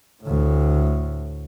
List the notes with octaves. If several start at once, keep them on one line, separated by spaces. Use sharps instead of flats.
D2 A2